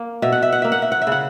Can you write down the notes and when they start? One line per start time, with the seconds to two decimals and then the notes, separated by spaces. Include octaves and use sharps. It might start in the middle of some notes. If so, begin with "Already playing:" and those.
Already playing: A#3
0.22 B2 E5
0.32 F#5
0.42 E5
0.52 F#5
0.62 A#3 E5
0.72 F#5
0.82 E5
0.92 F#5
1.02 E5
1.07 C#3 F#5